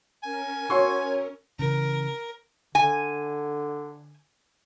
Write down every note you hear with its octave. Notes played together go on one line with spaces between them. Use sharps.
C#4 A#4 G#5
F#4 C#5 C6 C#6 E6
C#3 E3 A#4
D3 G#5